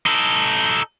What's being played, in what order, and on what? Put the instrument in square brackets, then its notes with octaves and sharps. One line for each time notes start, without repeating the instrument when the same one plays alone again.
[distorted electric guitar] D#4 A4